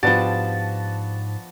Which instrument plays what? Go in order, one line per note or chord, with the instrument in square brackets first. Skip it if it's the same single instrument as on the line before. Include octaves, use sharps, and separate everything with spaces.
[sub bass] G#2 [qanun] F3 G4 [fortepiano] B3 D4 F#4 [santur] A5